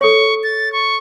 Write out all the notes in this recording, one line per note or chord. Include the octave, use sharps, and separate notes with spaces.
A4 C#5 C#6
A6
C#6